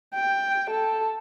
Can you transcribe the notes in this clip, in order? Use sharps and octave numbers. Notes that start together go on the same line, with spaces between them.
G5
A4